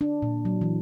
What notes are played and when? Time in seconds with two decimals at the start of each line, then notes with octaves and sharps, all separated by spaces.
0.01 D4
0.22 A#2
0.45 F#3
0.61 E3